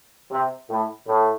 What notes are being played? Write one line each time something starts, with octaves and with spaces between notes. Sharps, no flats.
C3
A2
A2